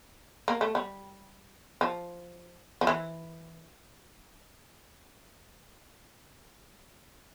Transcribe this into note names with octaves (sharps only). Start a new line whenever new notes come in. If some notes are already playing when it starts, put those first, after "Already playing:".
A#3
A3
G3
F3
F3
E3